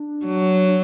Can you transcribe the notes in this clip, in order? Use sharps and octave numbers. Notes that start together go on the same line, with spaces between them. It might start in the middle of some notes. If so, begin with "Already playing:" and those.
Already playing: D4
F#3
D4